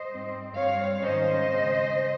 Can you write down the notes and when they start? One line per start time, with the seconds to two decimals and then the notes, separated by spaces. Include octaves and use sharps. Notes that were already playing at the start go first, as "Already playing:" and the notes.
Already playing: C5 D#5
0.08 G#2 G3 C4
0.55 G2 G3 C4 C#5 F5
1.02 G#2 D#3 G#3 C#4 C5 D#5
1.48 C#3 G#3 C4